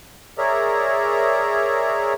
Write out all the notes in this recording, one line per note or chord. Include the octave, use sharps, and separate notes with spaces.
G#4 A#4 C#5 D5 E5 A#5